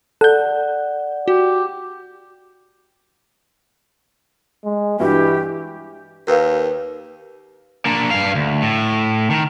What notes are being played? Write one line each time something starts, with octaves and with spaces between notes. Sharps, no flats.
A4 D5 F#5 F#6 G6
F#4 G4
G#3
G2 E3 E4 F#4 G4
D#2 A#4 B4 F5
A#3 D4
G2 F5
D2
A2
D#3